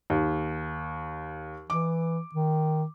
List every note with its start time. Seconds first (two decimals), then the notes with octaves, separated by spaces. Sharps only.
0.10 D#2
1.70 E3 D6
2.35 D#3